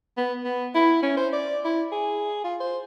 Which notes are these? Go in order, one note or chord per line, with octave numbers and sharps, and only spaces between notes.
B3
B3
E4
C#4
C5
D5
E4
G#4
F4
C5